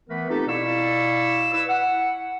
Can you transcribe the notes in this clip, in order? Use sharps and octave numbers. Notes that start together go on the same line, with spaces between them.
E3 A3 B3 A#4 B4
C4 D#4 F4 G4 A4
B2 E4 D5 F5 C#6 E6
E4 B4 E6
F#5